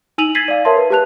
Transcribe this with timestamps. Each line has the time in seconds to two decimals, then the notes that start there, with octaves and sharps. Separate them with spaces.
0.18 D#4 G#5 E6 D#7 F7 F#7
0.35 G#6 A6 B6 C7 D#7 F#7
0.48 D5 F5
0.65 A#4 C#5 E5 A5 C6
0.77 B4
0.90 G4 B4 A5 F#6 F7